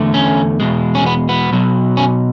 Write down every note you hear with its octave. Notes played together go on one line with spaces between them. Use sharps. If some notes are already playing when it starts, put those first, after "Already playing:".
Already playing: E2 D3 A3
C#4
E2 B2 G#3
C#4
B3
B3
B1 B2 F#3
C#4